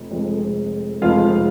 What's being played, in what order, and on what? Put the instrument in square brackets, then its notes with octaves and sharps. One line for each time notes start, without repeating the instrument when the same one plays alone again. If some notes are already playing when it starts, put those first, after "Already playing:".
Already playing: [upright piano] F1 F2
F1 F2 F3 G#3
F1 F2 F3 G#3 F4 F5